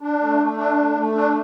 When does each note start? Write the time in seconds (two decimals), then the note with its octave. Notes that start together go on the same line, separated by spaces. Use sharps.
0.01 D4
0.20 A3
0.39 A3
0.57 D4
0.77 A3
0.96 A3
1.15 D4